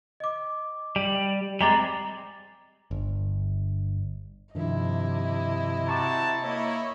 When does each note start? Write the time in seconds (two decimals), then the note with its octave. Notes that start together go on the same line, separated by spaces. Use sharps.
0.20 D#5 D6
0.96 G3
1.61 G3 G#3 C4 A#5 D6 A6
2.91 G1
4.55 G2 C3 D#3 F3 E4 D#5
5.87 C4 F#4 A5 A#5 C#6 D6
6.41 A#3 E4 C#5 D#5